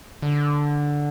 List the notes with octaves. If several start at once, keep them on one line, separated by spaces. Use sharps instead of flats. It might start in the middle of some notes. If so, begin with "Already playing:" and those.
D3